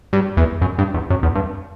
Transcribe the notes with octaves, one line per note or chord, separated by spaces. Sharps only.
G2
E2
F#2
G2
E2
F#2
E2
G2